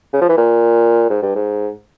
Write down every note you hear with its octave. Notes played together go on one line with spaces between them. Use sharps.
C#3
F3
E3
A#2
G#2
G2
G#2